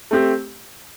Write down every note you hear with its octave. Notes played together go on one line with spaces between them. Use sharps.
A3 C4 G4